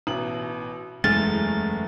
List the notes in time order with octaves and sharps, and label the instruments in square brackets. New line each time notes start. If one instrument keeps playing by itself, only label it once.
[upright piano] A1 B2 F#7
[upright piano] F#1 E2 F6 [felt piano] G#3 G#4 [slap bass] A3 [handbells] A6